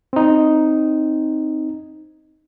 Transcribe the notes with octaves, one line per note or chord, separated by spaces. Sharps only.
C4 D#4